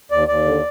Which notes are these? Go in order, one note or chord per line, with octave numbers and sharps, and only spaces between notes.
D#2 D5
D#2 D5
D3